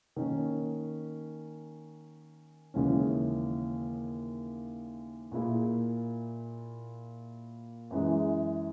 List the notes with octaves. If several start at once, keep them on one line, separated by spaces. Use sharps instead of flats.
D#3 A#3 C#4
D#2 C#3 E3 G#3 C#4
A#2 A#3 E4 G#4
F#2 E3 G#3